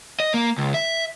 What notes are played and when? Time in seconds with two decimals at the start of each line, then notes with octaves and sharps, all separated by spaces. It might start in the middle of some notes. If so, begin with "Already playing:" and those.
0.20 D#5
0.34 A#3
0.58 C#2
0.74 E5